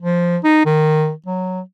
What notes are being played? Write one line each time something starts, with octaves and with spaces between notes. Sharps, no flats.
F3
D#4
D#3
F#3